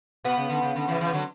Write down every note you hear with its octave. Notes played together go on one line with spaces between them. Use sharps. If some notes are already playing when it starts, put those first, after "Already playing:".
B2 B3
C#3
D3
C#3
D3
C#3 E3
C#3 E3
D3 F#3